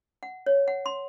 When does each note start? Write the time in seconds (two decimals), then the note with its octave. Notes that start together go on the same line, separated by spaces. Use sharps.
0.23 F#5
0.46 C#5
0.68 F#5
0.86 C6